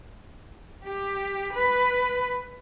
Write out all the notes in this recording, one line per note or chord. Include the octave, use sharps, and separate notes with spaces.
G4
B4